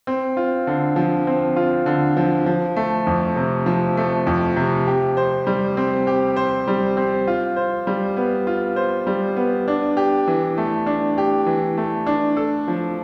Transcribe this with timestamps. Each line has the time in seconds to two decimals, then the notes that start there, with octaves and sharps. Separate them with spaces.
0.07 C4
0.37 F4
0.67 D3
0.96 F3
1.27 C4
1.56 F4
1.86 D3
2.17 F3
2.46 F3
2.76 A3
3.07 F2
3.36 C3
3.66 F3
3.97 A3
4.27 F2
4.56 C3
4.87 G4
5.17 C5
5.47 G3
5.77 C4
6.07 G4
6.36 C5
6.67 G3
6.97 C4
7.28 F4
7.57 C5
7.87 G3
8.17 B3
8.47 F4
8.76 C5
9.07 G3
9.36 B3
9.68 D4
9.97 G4
10.28 E3
10.58 A3
10.86 D4
11.18 G4
11.47 E3
11.77 A3
12.06 D4
12.37 A4
12.68 F3